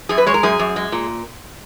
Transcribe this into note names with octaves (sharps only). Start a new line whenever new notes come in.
F#2 G#4
B4
G#3 C#5
A#4
F#2 G#4
F#2
G#3
A#2